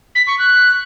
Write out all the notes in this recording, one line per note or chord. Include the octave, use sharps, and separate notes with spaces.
B6
C#6
F#6